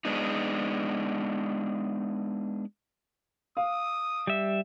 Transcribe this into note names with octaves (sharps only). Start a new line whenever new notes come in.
G#3 B3 D4 D#4
F5 D#6
G3 E5